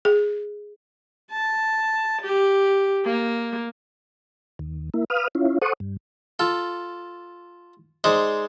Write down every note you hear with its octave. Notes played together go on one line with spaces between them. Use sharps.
G#4
A5
G4
A#3
D#2
A#3 E4
B4 F5 D#6 F6
C#4 E4 F4
A4 C5 F#5 C#6 D#6
G2
F4 A4
G#3 D#4 C5 D5